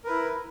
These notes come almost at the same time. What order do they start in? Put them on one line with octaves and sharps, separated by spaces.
A#4 B4 E4